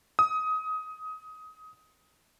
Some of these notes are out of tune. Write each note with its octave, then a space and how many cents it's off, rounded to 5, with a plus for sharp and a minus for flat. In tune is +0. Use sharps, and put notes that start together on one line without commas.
D#6 +20